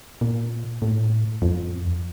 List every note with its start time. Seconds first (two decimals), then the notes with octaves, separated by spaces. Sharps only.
0.21 A#2
0.82 A2
1.42 F2